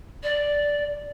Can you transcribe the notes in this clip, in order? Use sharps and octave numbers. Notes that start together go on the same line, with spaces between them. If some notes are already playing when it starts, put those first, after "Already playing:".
D5